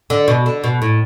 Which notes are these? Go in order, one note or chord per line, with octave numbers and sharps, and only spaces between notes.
D3
B2
D3
B2
A2